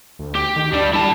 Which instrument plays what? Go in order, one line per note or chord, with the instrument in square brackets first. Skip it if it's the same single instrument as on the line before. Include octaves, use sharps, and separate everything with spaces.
[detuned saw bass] D2
[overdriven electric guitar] G4
[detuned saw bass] D#3
[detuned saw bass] D2 [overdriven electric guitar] G3 D4
[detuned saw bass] G3 [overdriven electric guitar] E4 A5